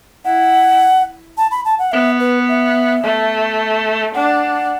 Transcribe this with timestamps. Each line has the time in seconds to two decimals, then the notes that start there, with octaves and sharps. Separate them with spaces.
0.25 E4 F#5
1.37 A5
1.51 B5
1.65 A5
1.79 F#5
1.92 B3 E5
2.20 B4
2.48 E5
3.03 A3
4.15 D4 F#5